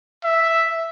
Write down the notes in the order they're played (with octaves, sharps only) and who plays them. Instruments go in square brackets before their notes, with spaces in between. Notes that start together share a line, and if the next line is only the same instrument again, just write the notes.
[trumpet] E5